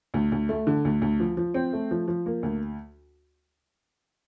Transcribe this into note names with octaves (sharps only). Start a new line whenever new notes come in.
D2
D2
A3
D3
D2
D2
F3
F3
C4
A3
F3
F3
A#3
D2